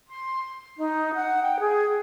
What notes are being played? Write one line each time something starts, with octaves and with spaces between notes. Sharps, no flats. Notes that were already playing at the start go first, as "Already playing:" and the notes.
C6
D#4
F#5
G5
G#4